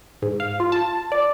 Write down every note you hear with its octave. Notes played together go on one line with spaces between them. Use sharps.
G#2
F5
F4
A5
D5